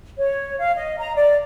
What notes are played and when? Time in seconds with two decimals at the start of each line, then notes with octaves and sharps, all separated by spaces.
0.18 C#5
0.59 F5
0.76 D#5
0.99 A#5
1.16 D5